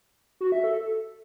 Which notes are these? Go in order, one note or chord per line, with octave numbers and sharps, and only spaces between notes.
F#4
E5
A4